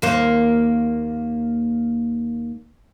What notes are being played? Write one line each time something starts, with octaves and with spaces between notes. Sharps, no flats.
D#2 A#3 C5